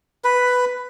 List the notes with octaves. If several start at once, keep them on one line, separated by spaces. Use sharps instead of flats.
B4